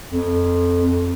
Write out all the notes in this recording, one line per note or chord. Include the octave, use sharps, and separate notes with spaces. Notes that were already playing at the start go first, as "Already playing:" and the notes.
F2